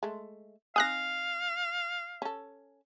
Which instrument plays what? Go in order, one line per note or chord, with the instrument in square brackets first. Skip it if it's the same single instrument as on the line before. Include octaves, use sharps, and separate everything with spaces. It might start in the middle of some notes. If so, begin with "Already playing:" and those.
[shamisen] G#3 A3
[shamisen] C4 D#4 G#5 [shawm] F5 [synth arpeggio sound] D#6 F#6 A#6
[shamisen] C#4 A4